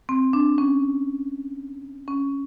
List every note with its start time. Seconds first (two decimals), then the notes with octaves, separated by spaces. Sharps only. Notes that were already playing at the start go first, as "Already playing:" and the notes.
0.09 C4
0.33 D4
0.58 C#4
2.08 C#4